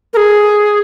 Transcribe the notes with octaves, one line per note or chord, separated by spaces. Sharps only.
A#4
G#4